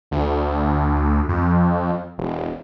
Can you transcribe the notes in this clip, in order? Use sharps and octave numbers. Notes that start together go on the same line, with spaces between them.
D2
F2
E1